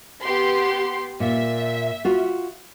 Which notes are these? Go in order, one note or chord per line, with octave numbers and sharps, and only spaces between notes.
B3 G4 C6
A#2 E5
F4 F#4